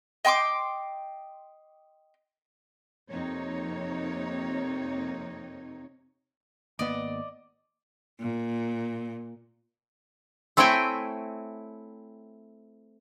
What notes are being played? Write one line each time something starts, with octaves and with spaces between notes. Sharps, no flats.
D#5 G5 C6 D6
F2 C3 A#3 C4 D#4 C#5
G#1 A#3 B3 D5 D#5
A#2
A3 C4 E4 C#5 G5 G#5